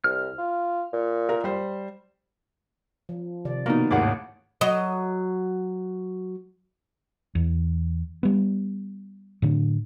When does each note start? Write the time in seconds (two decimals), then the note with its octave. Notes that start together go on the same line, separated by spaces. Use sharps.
0.04 C2 F6
0.38 F4
0.93 A#2
1.29 A#4
1.44 G3 C5
3.09 F3
3.45 C3 D#3 D5
3.66 B2 A#3 B3 D#4
3.91 G#1 D#2 A2 A#3 G#4 C#5 F#5 D6
4.61 F#3 D#5
7.35 E2
8.23 G3 B3
9.42 A2 D3